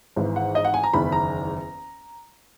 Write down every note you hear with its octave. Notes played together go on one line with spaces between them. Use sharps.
G#1 G#2 E3
F#5
D#5
F#5
G#5
A#5
F#1 E2 D#3 B5
A#5